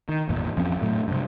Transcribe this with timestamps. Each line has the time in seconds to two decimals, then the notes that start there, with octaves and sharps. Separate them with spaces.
0.09 D#3
0.29 G#1 E2 A#2
0.57 F2 F3 C4 C#4
0.82 A2 F#3 A3
1.08 G2 C3